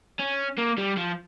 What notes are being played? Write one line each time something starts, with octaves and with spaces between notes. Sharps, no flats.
C#4
A#3
G3
F3